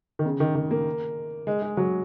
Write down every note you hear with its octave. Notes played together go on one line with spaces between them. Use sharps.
D#3
C#3
D#3
D#3
A#3
G#3
G#3
F#3